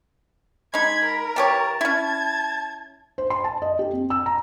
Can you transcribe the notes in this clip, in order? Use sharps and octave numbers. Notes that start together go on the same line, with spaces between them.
G#3 D#4 B5 G#6
A#4
E3 G4 C#5 A5
C#4 E4 G#6
C5
C6
A5
D#5
G4
C4
E6
A#5